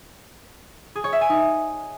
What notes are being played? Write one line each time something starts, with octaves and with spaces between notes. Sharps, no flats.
G#4
C#5
E5
G#5
D#4